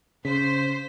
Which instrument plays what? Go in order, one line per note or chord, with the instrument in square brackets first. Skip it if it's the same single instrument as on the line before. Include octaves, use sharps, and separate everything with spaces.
[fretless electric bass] C#3 [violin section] C5 [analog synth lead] B6